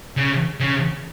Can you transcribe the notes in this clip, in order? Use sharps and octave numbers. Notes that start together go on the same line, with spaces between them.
C#3
C#3